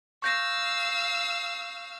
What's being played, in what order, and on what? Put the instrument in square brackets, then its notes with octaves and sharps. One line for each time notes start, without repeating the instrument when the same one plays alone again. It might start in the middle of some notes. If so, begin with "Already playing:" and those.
[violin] F5 E6 [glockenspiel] C#6 G6 A#6